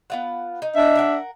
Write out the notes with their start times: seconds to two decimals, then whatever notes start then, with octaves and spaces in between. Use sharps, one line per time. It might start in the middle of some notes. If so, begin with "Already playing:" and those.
0.10 B3 F4 F#5
0.62 D#4
0.76 D4 E5
0.95 A#4 D#5 F#5